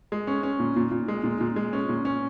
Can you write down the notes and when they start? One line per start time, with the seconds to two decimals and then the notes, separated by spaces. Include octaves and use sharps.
0.12 G#3
0.27 C#4
0.43 C#4
0.59 A#2
0.76 A#2
0.91 A#2
1.08 G#3
1.24 A#2
1.40 A#2
1.56 G#3
1.73 C#4
1.89 A#2
2.05 C#4